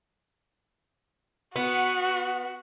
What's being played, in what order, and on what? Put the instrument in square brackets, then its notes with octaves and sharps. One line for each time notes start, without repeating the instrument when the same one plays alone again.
[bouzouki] B3 [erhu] F#4